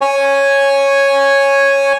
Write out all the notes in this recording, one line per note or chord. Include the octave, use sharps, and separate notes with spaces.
C#5 G#5